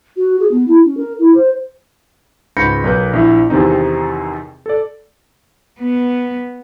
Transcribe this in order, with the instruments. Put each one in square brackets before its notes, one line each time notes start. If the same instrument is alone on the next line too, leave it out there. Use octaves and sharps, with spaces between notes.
[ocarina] F#4
G#4
B3
E4
C#4
A#4
E4
C5
[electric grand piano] C#2 G#2 B5 G6 A#6 C#7
B1 A#4 B4 G6
A#1 E4
E2 C3 D#3 C4 D#4
A4 D5
[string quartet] B3